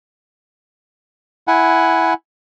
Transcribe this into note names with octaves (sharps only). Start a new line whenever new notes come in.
E4 F#5 G#5